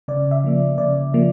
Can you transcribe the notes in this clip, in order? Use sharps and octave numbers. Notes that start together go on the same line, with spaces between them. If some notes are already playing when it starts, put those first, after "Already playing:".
C#3 D5
E5
F3 A#3
C#3 D5
F3 A#3